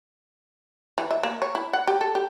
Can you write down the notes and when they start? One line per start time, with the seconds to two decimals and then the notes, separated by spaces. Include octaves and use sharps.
0.98 E3
1.11 E5
1.23 A#3
1.42 C#5
1.55 E4
1.73 F#5
1.87 G4
2.01 A4
2.15 G4